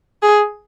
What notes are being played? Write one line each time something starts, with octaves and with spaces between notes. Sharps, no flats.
G#4